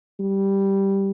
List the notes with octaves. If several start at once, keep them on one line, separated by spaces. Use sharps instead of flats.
G3